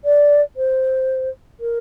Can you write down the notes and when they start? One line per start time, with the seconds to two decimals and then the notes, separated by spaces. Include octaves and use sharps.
0.05 D5
0.57 C5
1.60 A#4